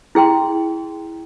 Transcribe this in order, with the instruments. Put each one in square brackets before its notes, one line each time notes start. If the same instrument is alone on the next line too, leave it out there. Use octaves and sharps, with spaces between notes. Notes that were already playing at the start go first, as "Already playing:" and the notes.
[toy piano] E4 G#4 G5 C6